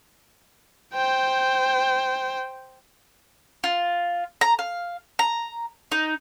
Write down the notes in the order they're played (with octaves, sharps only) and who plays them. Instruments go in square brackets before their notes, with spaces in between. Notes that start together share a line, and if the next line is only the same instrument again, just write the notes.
[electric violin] C5 G5
[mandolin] F4
A#5
F5
A#5
D#4